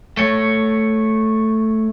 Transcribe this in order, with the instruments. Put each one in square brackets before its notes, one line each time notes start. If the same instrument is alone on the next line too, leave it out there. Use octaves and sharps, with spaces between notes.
[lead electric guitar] A3 C#5